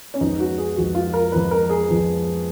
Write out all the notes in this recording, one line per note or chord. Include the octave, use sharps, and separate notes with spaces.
C#4
F2 F3 G#3 B3 D#4
F#4
G#4
F2 F3 G#3 B3 F#4
F4
A#4
F2 F3 G#3 B3 B4
A#4
G#4
F2 F3 G#3 B3